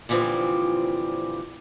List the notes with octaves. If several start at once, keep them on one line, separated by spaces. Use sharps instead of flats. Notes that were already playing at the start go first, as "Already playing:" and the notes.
A#2 D3 E3 F3 G3 C4